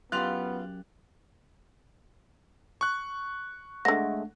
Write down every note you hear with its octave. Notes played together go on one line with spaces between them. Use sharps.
F#2 B3 F4 G4 F5 F#6 A6 F7
C#6 F#6
D3 G#3 A3 F#5 A#6